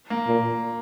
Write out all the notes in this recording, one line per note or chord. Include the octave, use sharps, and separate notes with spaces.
A#3
A#2